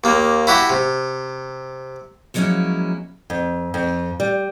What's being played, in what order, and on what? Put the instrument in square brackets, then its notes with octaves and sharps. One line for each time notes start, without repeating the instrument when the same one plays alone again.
[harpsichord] D#2 A#3
E4 F#4 G4
C3
[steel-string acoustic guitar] F3 F#3 G#3 A#3 C#4 E4
[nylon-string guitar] F2
F2
G3